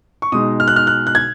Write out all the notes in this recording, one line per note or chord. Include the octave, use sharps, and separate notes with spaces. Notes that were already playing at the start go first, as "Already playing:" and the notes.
C#6
B2 G#3 D#4 D#6
F6
F#6
F6
F#6
F#6
G#6